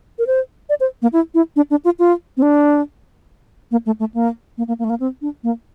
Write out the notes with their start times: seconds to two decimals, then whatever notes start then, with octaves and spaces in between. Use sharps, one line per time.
0.19 A#4
0.27 C5
0.69 D5
0.80 C5
1.02 A#3
1.13 E4
1.34 E4
1.56 D4
1.71 D4
1.85 F4
1.99 F4
2.37 C4
2.42 D4
3.71 A#3
3.86 A3
4.00 A3
4.14 A#3
4.58 A#3
4.68 A#3
4.79 A#3
4.84 A3
4.90 A#3
5.00 C4
5.22 D4
5.43 A#3